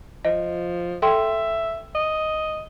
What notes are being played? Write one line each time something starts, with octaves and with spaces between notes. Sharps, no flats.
F3 D#5
A4 E5 G5 C6
D#5